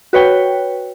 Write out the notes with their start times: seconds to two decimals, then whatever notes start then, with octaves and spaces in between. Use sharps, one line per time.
0.13 F#4 B4 C#5 G5